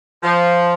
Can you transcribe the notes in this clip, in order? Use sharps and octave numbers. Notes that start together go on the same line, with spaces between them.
F3